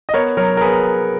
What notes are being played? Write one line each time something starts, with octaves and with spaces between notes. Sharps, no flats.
D#5
B3 A#4 C#5
F#3 A#4 C#5
A#4
B3 G#4 B4